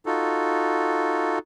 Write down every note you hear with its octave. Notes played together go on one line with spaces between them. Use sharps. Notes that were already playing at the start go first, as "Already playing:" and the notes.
D#4 F4 F#4 A4